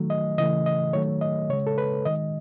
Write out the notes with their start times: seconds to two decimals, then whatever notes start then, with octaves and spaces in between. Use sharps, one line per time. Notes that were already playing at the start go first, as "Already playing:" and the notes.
Already playing: D#3 F#3 A3
0.10 D#5
0.38 C#3 E3 A3 D#5
0.66 D#5
0.93 D#3 F#3 A3 C#5
1.21 D#5
1.49 C#3 G#3 C#5
1.67 A4
1.78 B4
2.06 D#3 G#3 D#5